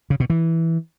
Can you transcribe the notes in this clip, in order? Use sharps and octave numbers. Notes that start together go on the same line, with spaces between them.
C#3
B2
E3